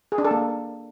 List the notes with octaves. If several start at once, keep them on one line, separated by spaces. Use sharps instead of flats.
G#4
D4
A4
A#3